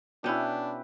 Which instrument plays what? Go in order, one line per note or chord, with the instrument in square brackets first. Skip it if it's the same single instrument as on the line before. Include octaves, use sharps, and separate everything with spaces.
[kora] B2 C#4 [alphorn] D4 [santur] E4 B4 G5